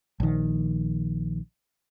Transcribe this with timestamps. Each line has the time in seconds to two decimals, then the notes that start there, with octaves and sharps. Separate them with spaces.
0.20 A#1 D#3